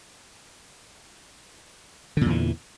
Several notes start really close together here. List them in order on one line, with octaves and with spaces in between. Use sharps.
D3 A#2 E2 E3